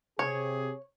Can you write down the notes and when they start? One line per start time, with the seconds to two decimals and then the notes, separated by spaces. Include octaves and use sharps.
0.19 C3 G4 G#4 C#5